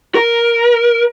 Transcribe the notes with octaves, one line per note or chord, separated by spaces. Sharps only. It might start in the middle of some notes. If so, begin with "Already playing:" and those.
A#4